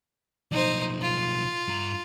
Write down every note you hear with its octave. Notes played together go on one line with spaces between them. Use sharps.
B1 F3 D#4 C5
F4
G2 A#5